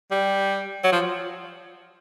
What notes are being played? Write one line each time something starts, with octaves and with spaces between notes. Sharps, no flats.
G3
F#3
F3